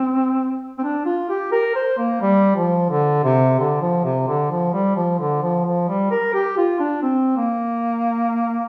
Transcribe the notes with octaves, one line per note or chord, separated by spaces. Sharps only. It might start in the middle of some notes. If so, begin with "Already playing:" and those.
Already playing: C4
C4
D4
F4
G4
A#4
C5
A#3
G3
F3
D3
C3
D3
F3
C3
D3
F3
G3
F3
D3
F3
F3
G3
A#4
G4
F4
D4
C4
A#3